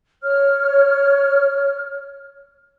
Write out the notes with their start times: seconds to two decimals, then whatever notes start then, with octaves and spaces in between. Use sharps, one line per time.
0.22 C#5 F6